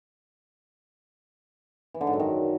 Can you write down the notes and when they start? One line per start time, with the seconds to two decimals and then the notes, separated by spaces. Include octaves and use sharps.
1.94 E3
2.01 D3
2.07 G#2
2.13 F#2
2.20 D#3